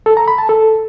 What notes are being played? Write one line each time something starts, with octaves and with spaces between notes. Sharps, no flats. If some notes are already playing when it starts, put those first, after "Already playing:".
A4
A#5
B5
A5
A4